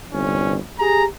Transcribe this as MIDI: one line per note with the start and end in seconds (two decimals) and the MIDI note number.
0.13 0.57 31
0.13 0.57 36
0.13 0.57 43
0.13 0.57 61
0.79 1.04 67
0.79 1.04 68
0.79 1.04 82